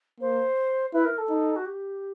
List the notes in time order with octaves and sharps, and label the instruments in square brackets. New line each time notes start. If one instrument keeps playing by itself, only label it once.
[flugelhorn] A#3 [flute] C5
[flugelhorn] E4 [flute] B4
[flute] A#4
A4
[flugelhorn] D#4
[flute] F#4
G4